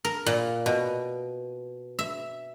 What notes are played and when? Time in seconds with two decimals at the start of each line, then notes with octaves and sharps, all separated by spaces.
0.05 A#4
0.26 A#2
0.66 B2
1.99 E5